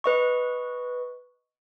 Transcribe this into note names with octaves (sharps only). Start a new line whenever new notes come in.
B4 D#5 C#6